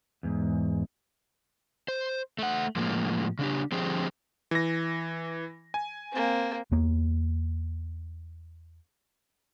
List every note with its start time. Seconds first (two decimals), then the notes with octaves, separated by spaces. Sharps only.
0.23 E2 G#2
1.88 C5
2.39 A3 F#5
2.76 A2 F3 G#3 A#3
3.39 C#3 D4 G4
3.72 D3 F3 C4 G4 G#4
4.51 E3 A#6
5.74 G#5
6.12 A#3 C4
6.71 E2 A#3